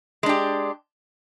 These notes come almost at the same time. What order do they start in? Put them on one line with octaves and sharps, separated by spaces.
G#3 D4 G4